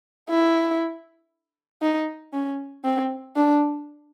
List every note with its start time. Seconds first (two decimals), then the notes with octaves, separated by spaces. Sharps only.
0.30 E4
1.82 D#4
2.33 C#4
2.84 C4
3.36 D4